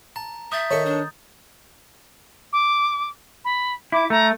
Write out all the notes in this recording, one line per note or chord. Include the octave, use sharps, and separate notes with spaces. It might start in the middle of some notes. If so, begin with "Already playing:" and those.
A5 A#5
E5 D#6 G6 A6
D#3 A4 C#5 C#6
D4
D6
B5
E4 D6
A3 A#5